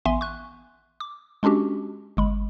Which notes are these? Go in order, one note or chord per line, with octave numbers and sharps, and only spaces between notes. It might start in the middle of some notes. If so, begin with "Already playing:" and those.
A1 B3 E5 G#5 C6
C#6 F#6
D6
G#3 C#4 D4 F#4 G4
G1 G#3 B5